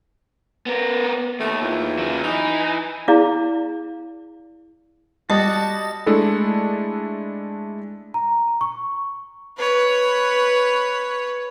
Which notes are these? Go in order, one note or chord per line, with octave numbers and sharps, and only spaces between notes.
B3 A#4
D#2 A3
E2 E4 F4
C#3 F#3
E3 D#4
E4 G#4 D5 F5 A#5 D6
G3 F#4 D#5 A5
G#3 A3 D4 E4 A4
A#5
C#6
B4 C#5